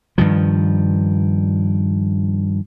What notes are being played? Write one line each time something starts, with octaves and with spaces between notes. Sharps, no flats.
G2 D#3 F3